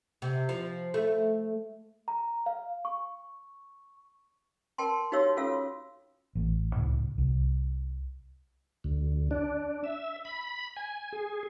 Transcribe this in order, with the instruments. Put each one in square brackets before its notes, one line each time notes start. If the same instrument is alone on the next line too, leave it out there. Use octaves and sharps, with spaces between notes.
[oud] C3
F3
A3
[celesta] A#5
F5
C#6
[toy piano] A#4 G5 A5 C6
D#4 F#4 G4 C#5 F5 E6
C#4 F4 F#4 A4 F5 E6
[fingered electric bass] A1 A3
C#2 A2
C2
[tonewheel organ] D2
D4
E5
B5
G#5
G#4